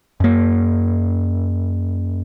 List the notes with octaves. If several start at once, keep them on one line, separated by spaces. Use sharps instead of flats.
F#2 A#3